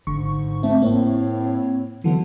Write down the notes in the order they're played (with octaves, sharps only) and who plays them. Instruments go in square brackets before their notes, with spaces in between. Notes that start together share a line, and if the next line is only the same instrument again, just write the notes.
[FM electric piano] G#1 D3 C#6 [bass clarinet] G#2
[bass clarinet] A3 [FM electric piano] C4
[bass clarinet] A2 [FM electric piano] A#3 C4 C#5
[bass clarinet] D3 [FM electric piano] E3 F#3 B3